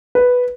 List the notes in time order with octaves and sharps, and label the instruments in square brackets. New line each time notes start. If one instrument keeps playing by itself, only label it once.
[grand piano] B4